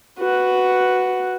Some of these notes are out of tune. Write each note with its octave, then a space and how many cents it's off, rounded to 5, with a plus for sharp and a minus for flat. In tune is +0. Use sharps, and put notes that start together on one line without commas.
F#4 +0 B4 +0